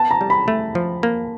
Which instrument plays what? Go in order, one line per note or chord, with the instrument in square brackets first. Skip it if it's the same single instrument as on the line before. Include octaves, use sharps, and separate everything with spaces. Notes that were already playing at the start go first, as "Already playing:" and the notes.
Already playing: [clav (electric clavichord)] B3 [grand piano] A5
[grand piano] A#5
[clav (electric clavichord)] G3
[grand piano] B5
[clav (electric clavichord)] A3
F3
A#3